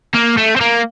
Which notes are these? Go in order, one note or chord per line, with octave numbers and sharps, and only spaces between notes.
A#3
A3
C4
A#3